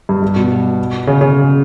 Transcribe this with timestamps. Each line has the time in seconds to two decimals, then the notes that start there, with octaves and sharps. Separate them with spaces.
0.09 G2
0.22 G2
0.36 B2
1.07 C#3
1.21 C#3